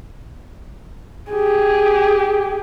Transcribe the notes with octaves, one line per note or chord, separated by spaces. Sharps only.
G4 G#4